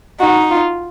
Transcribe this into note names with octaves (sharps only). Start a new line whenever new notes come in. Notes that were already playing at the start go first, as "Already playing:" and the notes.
D#4 F#4
F4